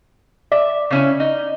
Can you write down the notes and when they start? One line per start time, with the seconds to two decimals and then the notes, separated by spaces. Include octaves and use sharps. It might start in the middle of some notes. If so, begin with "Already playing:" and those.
0.52 D5 E5
0.91 C#3 C#4 E4
1.20 D#4